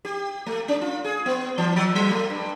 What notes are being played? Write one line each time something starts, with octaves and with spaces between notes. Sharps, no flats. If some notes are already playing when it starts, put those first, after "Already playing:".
G4
A3
C#4
F4
G#4
B3
E3
F3
F#3
A3
G2